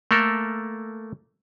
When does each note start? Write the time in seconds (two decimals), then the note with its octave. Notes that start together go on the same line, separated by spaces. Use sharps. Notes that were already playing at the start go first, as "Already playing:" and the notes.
0.11 A3 A#3 A4 A#4